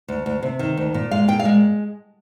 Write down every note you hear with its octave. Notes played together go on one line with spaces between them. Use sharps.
D2
D2
C3
D#3
D2
A#2
G#3 F5
A#2 G5
F5
G#3